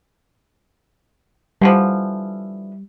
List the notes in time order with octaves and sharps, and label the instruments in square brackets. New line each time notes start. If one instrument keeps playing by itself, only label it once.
[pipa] D3 E3 F3 [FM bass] G3